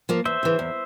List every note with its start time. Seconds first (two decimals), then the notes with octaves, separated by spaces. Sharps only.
0.09 F3 A#3
0.25 E2 C5 E5
0.43 C#3 E3
0.59 E2